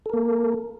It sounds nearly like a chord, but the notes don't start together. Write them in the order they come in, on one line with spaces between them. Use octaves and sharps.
A4 A#4 A#3